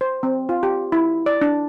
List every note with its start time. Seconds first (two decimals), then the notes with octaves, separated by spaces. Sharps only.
0.01 C5
0.23 C4
0.49 F4
0.63 G4
0.92 E4
1.26 D5
1.41 D4